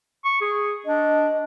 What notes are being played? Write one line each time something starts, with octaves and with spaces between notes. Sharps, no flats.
C#6
G#4
D4 D#5